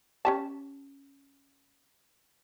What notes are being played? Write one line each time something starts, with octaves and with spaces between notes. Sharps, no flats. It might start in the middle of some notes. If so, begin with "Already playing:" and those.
C#4 G4 A5